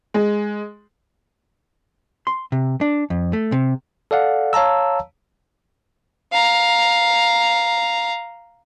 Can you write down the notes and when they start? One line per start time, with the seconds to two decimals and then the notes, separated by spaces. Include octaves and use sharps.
0.14 G#3
2.27 C6
2.52 C3
2.81 D4
3.10 F2
3.33 A3
3.52 C3
4.11 A4 D5 F5 F#5
4.53 C#5 F5 A5 A#5 E6
6.32 F5 A#5